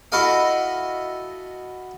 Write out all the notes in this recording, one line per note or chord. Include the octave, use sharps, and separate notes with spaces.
E4 F#4 A4 D#5 F5